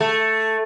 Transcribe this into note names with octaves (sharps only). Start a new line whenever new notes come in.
A3